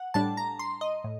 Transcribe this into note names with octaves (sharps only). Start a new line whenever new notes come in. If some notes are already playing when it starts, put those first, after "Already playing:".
Already playing: F#5
A2 G3 D4 A5
A#5
C6
D#5
A2